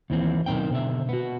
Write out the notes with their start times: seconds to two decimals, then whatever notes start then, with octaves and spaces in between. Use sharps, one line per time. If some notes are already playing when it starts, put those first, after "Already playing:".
0.10 D#2 E3 C4
0.46 B1 C3 D#3 C4 G5
0.70 B2 D3 E5
1.09 B3 F#4